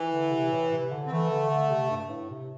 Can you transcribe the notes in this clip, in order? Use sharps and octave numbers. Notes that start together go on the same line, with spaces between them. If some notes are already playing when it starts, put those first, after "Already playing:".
Already playing: E3
D3
C3
A2
C3
D3
C4
E3 A3
D3
D3
C3
G2
A2
C3